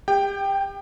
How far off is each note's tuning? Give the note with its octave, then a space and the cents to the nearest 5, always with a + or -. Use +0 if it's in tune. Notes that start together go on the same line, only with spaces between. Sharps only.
G4 +35 G5 +0